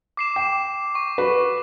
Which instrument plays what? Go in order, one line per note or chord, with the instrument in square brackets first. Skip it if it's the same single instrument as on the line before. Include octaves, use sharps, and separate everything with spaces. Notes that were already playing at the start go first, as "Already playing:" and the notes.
[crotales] D6 C7 E7
[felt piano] G5 [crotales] D6
[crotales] C#6
[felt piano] F#4 B4